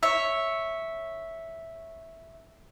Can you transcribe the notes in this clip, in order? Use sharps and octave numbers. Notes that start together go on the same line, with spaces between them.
C#5 E5